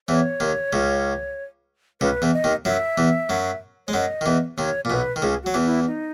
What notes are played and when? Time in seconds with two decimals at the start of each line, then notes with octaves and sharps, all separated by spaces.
0.08 E2 E3 C#5
0.40 D#2 D#3
0.73 C#2 C#3
2.01 C#2 C#3 B4
2.22 E2 E3
2.33 D#5
2.44 D#2 D#3
2.65 F#2 F#3 E5
2.98 E2 E3
3.29 F#2 F#3
3.87 G#3 C#5
3.93 F#2 F#3 D#5
4.21 D#3
4.26 E2 E3
4.58 D#2 D#3 C#5
4.85 A#2
4.90 B1 B2 B4
5.16 D#3
5.22 C#2 C#3 G#4
5.43 F#3 F#4
5.54 E2 E3
5.65 E4
5.87 D#4